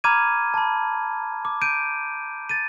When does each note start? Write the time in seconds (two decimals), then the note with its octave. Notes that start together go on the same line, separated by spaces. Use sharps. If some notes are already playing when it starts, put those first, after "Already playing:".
0.04 A#5 B5 D6 F6 G#6 D#7
0.54 A5 B5
1.45 D6
1.61 G6 D7 D#7
2.49 A6 D#7